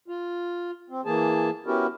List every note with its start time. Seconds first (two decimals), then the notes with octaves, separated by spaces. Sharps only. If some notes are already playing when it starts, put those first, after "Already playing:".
0.08 F4
0.90 C4
1.05 E3 A#3 G#4 A5
1.66 B3 C#4 E4 F#4 G4 A#4